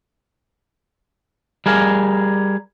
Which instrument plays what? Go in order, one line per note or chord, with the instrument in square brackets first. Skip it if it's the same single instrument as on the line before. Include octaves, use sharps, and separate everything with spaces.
[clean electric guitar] G3 G#4 A#4 F5